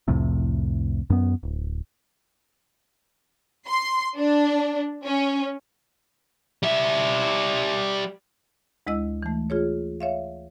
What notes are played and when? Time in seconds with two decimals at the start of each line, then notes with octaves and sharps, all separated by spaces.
0.08 C2 F2 A2 C3
1.10 F#2 B3
1.43 D1
3.66 C6
4.18 D4
5.04 C#4
6.63 G3 E5
8.87 D2 G#3 E4 D#5 E6
9.23 E3 A3
9.50 F4 G#4 C#5
10.00 C#5 E5 F5